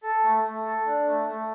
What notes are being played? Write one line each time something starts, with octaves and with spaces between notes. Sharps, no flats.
A4
A3
A3
A4
D4
A3
A3